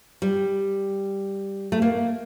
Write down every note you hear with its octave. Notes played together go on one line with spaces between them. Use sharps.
G3
A3
A#3